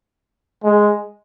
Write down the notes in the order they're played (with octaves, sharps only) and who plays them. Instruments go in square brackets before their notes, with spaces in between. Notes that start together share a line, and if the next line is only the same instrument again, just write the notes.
[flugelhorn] G#3